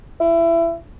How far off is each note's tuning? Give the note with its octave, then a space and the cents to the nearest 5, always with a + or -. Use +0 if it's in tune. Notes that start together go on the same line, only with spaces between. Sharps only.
E4 +25